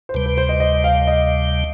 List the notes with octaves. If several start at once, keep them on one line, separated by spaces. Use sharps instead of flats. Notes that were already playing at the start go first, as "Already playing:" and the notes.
C5
D2 C3 G3 B4
B4
C5
D#5
D#5
F5
D#5